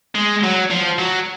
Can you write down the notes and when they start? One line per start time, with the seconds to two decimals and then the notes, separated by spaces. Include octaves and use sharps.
0.15 G#3
0.43 F#3
0.70 F3
0.98 F#3